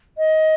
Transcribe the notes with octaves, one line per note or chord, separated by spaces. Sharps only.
D#5